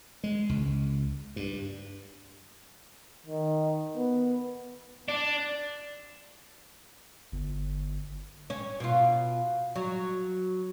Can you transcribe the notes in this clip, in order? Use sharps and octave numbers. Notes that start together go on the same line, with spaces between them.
G#3
C#2
G2
D#3
B3
D4
G1
C#4
B2 F4
F#3